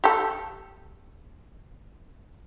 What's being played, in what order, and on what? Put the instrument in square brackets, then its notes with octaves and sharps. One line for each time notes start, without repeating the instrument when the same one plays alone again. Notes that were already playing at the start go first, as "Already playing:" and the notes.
[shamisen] G4 A4